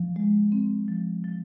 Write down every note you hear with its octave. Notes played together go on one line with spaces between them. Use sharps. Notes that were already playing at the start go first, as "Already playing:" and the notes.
Already playing: F3
G#3
C4
F3
F3